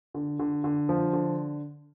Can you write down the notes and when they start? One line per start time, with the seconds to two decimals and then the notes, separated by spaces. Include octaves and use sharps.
0.14 D3
0.39 D3
0.64 D3
0.89 F3
1.13 D3